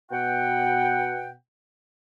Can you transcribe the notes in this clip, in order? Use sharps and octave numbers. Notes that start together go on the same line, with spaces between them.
B2 F#5 G5